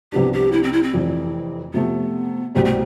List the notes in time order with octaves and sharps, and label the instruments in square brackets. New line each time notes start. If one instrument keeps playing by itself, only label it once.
[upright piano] C2 C3 F3 B3 D4 [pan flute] G4
[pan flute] G4
E4
C4
E4
C4
[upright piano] F1 F2 E3
[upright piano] C3 F3 A3 [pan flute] B3
[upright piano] C2 B2 G3 C4 [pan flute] A3
[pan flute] A3